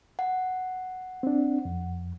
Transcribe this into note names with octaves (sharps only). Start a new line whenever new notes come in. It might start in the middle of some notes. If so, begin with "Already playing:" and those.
F#5
C4 D4
F2